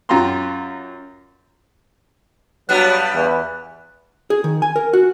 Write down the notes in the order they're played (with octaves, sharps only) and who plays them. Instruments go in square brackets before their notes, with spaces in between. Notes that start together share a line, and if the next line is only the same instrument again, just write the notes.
[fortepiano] F#2 F4 G4 A#5 C6
[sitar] G2 G3 B3 [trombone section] F#3 [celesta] F#6
[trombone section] E2 E3
[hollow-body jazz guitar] G#4
D#3
G#5
A#4
F#4